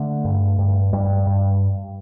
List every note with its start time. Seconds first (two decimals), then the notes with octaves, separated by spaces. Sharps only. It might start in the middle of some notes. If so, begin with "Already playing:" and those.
Already playing: D3 A3
0.25 G2
0.58 G2
0.93 G2 G3
1.27 G2